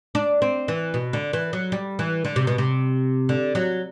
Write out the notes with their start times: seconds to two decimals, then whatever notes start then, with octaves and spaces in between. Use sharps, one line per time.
0.15 D4
0.42 C4
0.68 E3
0.94 B2
1.13 D3
1.33 E3
1.53 F#3
1.72 G3
1.99 E3
2.25 D3
2.36 C3
2.47 B2
2.58 C3
3.29 D3
3.55 F#3